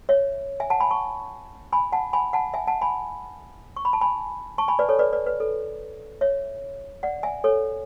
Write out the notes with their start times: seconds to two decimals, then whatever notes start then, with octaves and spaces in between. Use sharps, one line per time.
0.09 C#5 E5
0.60 E5 G#5
0.70 F#5 A5
0.80 G#5 B5
0.90 A5 C#6
1.73 G#5 B5
1.92 F#5 A5
2.13 G#5 B5
2.33 F#5 A5
2.54 E5 G#5
2.67 F#5 A5
2.82 G#5 B5
3.76 C#6
3.85 B5
3.93 A5
4.01 G#5 B5
4.58 A5 C#6
4.68 G#5 B5
4.79 B4 D5
4.89 A4 C#5
4.99 B4 D5
5.13 B4 D5
5.26 B4
5.40 A4
6.21 C#5 E5
7.03 D5 F#5
7.23 E5 G#5
7.44 A4 C#5